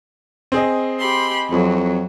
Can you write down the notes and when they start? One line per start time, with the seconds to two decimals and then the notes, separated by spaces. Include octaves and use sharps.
0.52 C4 G#4 D#5
0.99 G4 B5 C6
1.51 F2 F#3